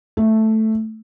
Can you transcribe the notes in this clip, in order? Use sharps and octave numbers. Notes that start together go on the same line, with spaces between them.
A3